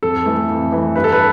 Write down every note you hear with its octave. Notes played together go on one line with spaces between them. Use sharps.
F2 A4
E3 A3
F2
E3 A3
G2 B4
A4
B4